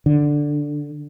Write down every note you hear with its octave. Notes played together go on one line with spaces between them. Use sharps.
D3